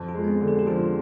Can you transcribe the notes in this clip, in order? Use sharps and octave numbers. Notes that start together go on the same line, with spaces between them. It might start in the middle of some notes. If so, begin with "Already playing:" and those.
Already playing: F2
F4
G#3
B3
C4
D3
G#4
G4
F3 F4